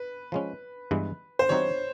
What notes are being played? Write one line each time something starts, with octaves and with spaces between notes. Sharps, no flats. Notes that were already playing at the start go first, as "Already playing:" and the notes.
Already playing: B4
F3 G#3 C#4
G2 E3 G#3 B3
C5
E3 G3 C4 D#4 F#4 C#5